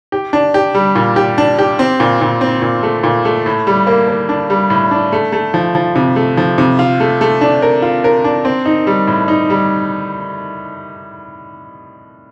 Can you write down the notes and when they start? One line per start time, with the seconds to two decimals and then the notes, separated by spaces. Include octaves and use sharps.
0.12 G4
0.33 D4
0.54 G4
0.75 G3
0.96 A#2
1.16 G4
1.38 D4
1.59 G4
1.79 C4
2.00 A#2
2.21 A#2
2.41 C4
2.62 A#2
2.83 A3
3.04 A#2
3.25 A3
3.46 A2
3.67 G3
3.87 A#3
4.08 A#3
4.29 D4
4.50 G3
4.70 A2
4.91 D4
5.12 A3
5.32 A3
5.54 F3
5.75 F3
5.95 C3
6.16 A3
6.37 F3
6.58 C3
6.79 F4
7.00 A3
7.21 A3
7.41 D4
7.62 A#4
7.82 F4
8.04 A#4
8.24 D4
8.45 C4
8.66 D#4
8.87 G3
9.08 A2
9.28 D#4
9.50 G3